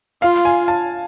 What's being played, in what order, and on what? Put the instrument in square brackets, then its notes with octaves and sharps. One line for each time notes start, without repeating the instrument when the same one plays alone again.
[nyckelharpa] F4 [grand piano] F5
[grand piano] G#5
A5